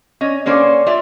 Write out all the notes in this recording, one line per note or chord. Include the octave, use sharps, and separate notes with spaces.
C#4 D#5
D3 A#3 C#4 C5 D5 G#5
F4 D5 E5